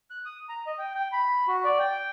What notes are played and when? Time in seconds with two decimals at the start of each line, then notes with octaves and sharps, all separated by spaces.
0.10 F#6
0.25 D#6
0.49 A#5
0.67 D#5
0.79 G5
0.95 G5
1.12 B5
1.48 F#4
1.65 D5
1.79 G5